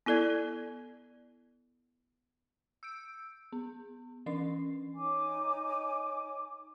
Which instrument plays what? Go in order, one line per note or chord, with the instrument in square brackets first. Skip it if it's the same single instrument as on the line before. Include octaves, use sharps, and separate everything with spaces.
[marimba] B3 E4 A4 D5 G#6
[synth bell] E6 G6 D7
B3
E3 C#4 D4 C7
[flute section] D#4 C#5 G#5 D6